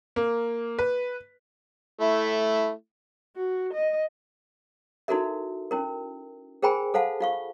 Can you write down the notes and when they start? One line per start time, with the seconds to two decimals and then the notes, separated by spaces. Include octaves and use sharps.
0.16 A#3
0.79 B4
2.01 A3 E4
3.36 F#4
3.74 D#5
5.08 D#4 E4 F#4 A4 A#4 E5
5.71 C#4 E4 A#4
6.62 G#4 A#4 C5 G5 G#5 B5
6.94 A4 C5 F5 F#5 A5
7.20 F4 F5 C#6